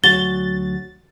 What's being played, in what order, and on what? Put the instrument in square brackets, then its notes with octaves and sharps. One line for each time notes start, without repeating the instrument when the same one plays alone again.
[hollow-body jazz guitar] D2 F#3 F#4 [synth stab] A6 [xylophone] G7